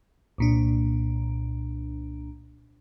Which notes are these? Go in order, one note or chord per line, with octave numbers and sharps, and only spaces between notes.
C2 A#2 D4